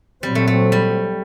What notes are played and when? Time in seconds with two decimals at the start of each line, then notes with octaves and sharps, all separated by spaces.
0.23 A#2 F#3 G3 C4
0.35 A3
0.47 A3
0.72 G3